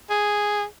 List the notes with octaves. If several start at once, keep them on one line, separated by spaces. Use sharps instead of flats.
G#4